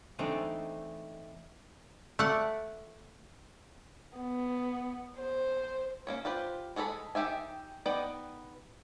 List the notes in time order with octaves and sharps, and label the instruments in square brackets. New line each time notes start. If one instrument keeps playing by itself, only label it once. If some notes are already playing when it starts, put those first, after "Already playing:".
[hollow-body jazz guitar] E3 A3 C4 D4 D#4
[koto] A3 D5 F#5
[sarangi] B3
C5
[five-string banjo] A#3 C#4 C#5
F4 G4 B4 C5
G#3 G#4 A4 C5 B5
D#3 F3 G4 E5 G#5
B3 D#4 B4 D5 G5